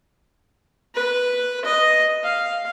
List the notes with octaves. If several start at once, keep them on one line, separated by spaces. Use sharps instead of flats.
B4
D#5
F5